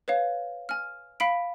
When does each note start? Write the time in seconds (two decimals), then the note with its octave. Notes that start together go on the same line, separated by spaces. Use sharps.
0.08 B4 C#5 F5
0.69 G#5 F6
1.20 F5 B5 B6 D7